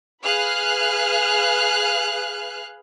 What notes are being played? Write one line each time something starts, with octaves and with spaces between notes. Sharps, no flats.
G#4 B4 F5 F6 F#6